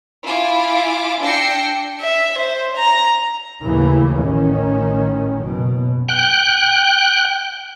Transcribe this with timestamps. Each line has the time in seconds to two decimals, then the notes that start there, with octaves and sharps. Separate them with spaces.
0.25 E4 F4 G#5 D6
1.22 D4 G5 E6 A#6 C7 C#7
2.01 E5
2.38 C5
2.77 A#5
3.64 D#2 A2 C#3 E3
4.21 A1 A2 D#3 C#4
5.37 F#1 B2
6.09 G5 F#6